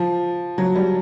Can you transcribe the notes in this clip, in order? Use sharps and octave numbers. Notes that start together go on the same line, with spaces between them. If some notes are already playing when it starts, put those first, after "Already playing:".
Already playing: F3
F#3
G3